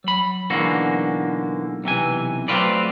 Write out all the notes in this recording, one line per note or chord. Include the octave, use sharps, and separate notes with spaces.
F#3 B5
B1 D3 E3 G#3 A#3 F#4
B1 C3 E3 G#5
F#3 A3 C4 F4 B4 D5